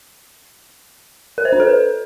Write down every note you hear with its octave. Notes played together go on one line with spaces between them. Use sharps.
A#4
C5
D4
A4
B4